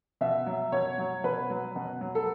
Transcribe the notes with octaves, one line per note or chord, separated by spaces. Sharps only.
B2 E5
F#3
B2 C#5
F#3
B2 B4
F#3
B2
F#3
A4